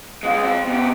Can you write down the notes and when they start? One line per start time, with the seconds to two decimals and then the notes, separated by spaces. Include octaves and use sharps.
0.23 G#3 F4
0.43 C4 F4
0.68 B2 G4